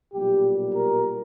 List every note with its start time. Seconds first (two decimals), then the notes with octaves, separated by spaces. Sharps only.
0.13 B1 A#2 G3 G4
0.75 A#4